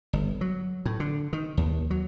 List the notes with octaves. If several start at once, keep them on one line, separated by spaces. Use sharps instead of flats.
G1
F#3
A2
D3
D#3
D#2
F#3